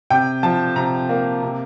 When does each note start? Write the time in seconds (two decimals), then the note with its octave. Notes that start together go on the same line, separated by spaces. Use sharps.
0.10 C3 G5
0.43 F3 A5
0.76 C3 A#5
1.09 A#3
1.42 C3